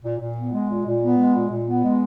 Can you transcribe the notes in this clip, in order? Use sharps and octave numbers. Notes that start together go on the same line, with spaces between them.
A#2
A#2
B3
G#3
A#2
A#2
B3
G#3
A#2
A#2
B3
G#3